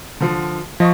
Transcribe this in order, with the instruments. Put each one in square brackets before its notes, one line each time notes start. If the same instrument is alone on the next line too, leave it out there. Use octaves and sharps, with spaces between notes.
[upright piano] D3 F3
[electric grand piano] F3 [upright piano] D#5 C#6